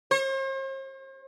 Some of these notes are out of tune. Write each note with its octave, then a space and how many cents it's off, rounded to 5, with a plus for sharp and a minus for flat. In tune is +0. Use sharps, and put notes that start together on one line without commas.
C5 +45